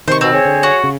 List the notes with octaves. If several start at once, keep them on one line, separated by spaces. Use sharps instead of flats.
C3 D#3 C5 C#6
B2 C4
G#4 C#5
D3
F#4
C#3